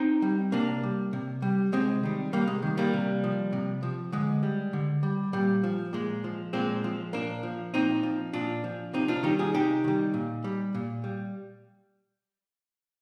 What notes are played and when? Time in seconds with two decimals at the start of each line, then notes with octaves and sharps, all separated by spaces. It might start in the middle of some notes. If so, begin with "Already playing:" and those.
Already playing: C4 D#4
0.22 G3
0.52 C3 A#3 D4
0.83 G3
1.13 C3
1.42 G3
1.72 C3 G#3 C4
2.03 D#3 G3
2.33 C3 G3 A#3
2.47 G#3
2.62 D#3 G3
2.77 G3 A#3
2.94 C3
3.24 F3
3.53 C3
3.83 F3
4.12 D3 G#3
4.43 G3
4.73 D3
5.03 G3
5.33 A#2 G3
5.64 F3
5.93 A#2 G#3
6.24 F3
6.53 A#2 G#3 C4
6.84 F3
7.13 A#2 A#3 D4
7.43 F3
7.74 A#2 C4 D#4
8.03 F3
8.33 A#2 D4 F4
8.64 F3
8.93 C3 C4 D#4
9.08 D4 F4
9.23 D#3 G3 D#4 G4
9.38 F4 G#4
9.54 C3 D#4 G4
9.84 D#3 G3
10.14 A#2
10.44 G3
10.75 A#2
11.04 G3